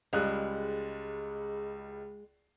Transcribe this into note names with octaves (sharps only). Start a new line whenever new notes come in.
C#2 G3 G#3 F#6